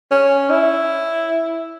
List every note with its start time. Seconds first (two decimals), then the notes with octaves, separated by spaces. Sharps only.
0.11 C#4
0.50 E4